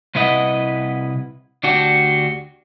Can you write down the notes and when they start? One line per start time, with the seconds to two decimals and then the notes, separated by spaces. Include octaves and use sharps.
0.15 C2 C3 E4 B4 D#5 F#5
1.63 D2 D4 F#4 G4